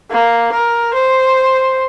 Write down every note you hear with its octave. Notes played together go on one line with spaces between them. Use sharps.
A#3
A#4
C5